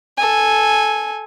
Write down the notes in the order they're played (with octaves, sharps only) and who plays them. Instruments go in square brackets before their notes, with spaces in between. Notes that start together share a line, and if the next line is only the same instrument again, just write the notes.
[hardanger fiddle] A4 G#5